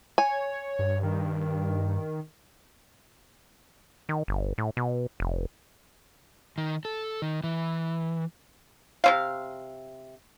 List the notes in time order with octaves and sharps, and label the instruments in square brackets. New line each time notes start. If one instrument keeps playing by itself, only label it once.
[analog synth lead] C#5 [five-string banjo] G#5
[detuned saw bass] G2
[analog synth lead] D#3
[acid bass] D#3
G1
A2
B2
F1
[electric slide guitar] D#3
A4
D#3
E3
[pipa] C3 C#4 F5